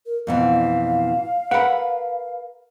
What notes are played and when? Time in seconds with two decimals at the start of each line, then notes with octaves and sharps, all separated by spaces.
0.06 A#4
0.27 F2 B2 E3 F5
1.51 A#4 B4 F#5 B5